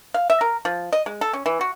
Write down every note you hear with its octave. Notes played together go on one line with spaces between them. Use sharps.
F5
E5
A#4
F3
D#5
G#3
A4
C#4
E3
F#4